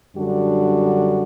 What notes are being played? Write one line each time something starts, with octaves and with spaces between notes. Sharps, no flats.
F#2 D3 G3 D4 F#4